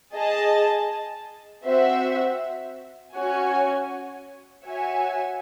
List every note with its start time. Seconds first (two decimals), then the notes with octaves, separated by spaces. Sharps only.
0.15 G#4 D#5 A5
1.64 C4 F#4 C5 E5
3.16 C#4 F#4 C#5 G#5
4.66 F#4 C#5 E5 G#5